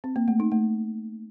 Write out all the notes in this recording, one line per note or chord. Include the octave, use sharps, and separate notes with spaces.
C4
A#3
A3
D#4
A3